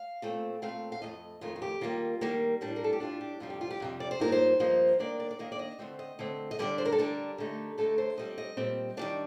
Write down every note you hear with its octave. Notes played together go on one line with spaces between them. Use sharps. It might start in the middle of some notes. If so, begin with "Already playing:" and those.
Already playing: F5
A#2 A3 C4
A#2 A3 C4 F5
F5
F2 D#3 A3 D#5
F2 D#3 A3 F4
F4
G4
D#3 G3 A#3 F4
D#3 G3 A#3
A2 G3 D4
A#4
A4
G4
A2 G3 D4 F4
G4
F2 C3 G3 F4
G4
F4
G4
F2 C3 G3
D5
C5
G2 F3 A#3 D#4 A#4
C5
G2 F3 A#3 D#4
D#3 A#3 D4 D5
D5
D5
D#3 A#3 D4 D#5
D5
D#5
D3 A3 C4 C5
D#5
D3 A3 C4
D#5
D3 G3 D4 D5
C5
A#4
A4
D3 G3 D4 A#4
D3 A3 D#4
D3 A3 D#4 A4
C5
A#2 G3 C4 D#5
D#5
A#2 G3 C4
D#3 G3 D4 D5